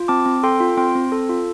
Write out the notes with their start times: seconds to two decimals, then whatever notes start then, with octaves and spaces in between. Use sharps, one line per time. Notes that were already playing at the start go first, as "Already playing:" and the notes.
Already playing: F4
0.08 C4 A5 D6
0.26 C4
0.43 A4 G5 C6
0.60 F4
0.77 C4 G5 C6
0.95 C4
1.12 A4
1.29 F4